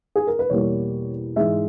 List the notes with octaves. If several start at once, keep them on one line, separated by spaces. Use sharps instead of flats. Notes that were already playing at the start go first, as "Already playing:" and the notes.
G#4
A#4
B4
E2 B2 G3 A#3 C#5
G#2 E3 G#3 E5